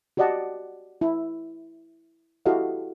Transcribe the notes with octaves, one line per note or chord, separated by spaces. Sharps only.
F#4 G4 D5 D#5 F#5 A5
E4
E4 F#4 G4 A4 D#5 F5